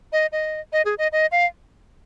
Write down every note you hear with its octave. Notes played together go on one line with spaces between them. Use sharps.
D#5
D#5
D#5
G#4
D#5
D#5
F5